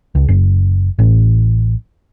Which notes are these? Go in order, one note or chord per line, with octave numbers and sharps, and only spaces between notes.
C#2
F#1
A1